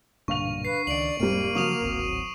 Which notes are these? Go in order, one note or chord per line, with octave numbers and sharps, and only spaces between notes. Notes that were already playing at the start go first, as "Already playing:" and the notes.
B1 G2 A#2 D3 F5 C#6 F7
B4 C7
C#2 D#3 D5 D7 F#7
E1 G#2 G3 A#3 C4 D#7
C#3 F3 F#3 C#6 D#6 F7
D1 G#1 C4